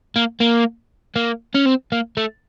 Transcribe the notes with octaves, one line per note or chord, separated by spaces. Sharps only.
A#3
A#3
A#3
C#4
C4
A#3
A3